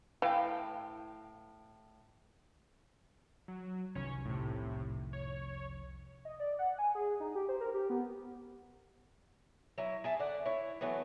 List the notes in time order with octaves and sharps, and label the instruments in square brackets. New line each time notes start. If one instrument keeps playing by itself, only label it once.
[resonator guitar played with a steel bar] A2 F5 G5 [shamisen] E3
[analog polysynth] F#3
[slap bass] F1 C2 D#3 [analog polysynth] C#4 C#5
[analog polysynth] A2 C3
C#5
[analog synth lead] D#5
D5
F#5
G#5
G#4
D#4
G4
C5
A#4
G4
B3
[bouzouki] F#3 E4
G#4 E5 A5
D3 D5 F#5
E4 C#5
E3 F#3 A3 B3